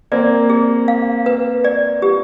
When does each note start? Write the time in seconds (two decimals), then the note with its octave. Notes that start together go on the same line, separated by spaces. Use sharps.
0.12 A#3 C4 D5
0.50 G#4
0.88 F5
1.26 B4
1.64 D5
2.02 G4